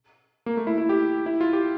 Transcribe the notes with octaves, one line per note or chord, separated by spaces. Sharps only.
A#3
A3
E4
E4
G4
E4
F4
G4